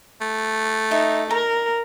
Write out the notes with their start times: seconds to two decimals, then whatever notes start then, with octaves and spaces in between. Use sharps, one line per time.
0.21 A3
0.91 D#4 E5
1.31 A#4 A#5